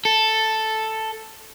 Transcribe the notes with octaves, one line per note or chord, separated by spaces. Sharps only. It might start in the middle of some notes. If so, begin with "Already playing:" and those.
A4